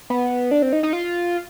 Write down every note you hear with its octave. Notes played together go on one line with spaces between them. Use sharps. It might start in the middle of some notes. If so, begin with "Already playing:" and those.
B3
D4
C4
D#4
D#4
F4